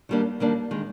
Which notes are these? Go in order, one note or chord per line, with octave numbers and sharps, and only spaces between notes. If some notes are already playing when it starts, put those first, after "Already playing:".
D#3 G3 A#3 D4
D#3 G3 A#3 D4
D#3 G#3